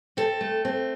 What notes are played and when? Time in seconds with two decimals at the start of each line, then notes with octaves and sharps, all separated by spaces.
0.17 C4 A4
0.41 A3
0.65 C4